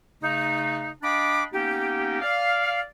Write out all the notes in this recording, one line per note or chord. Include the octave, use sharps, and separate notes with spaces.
C#3 A3 D#4
D4 D#5 F5 G5 B5 D6
A#3 B3 C#4 D#4 G4
D5 F5